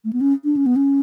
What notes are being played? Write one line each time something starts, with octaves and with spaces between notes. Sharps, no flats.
A3
B3
C#4
D4
C#4
B3
C#4